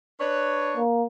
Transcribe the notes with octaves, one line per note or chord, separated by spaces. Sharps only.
D4 B4 C#5
A#3